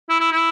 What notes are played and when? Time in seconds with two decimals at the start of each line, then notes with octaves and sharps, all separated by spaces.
0.10 E4
0.21 E4
0.32 E4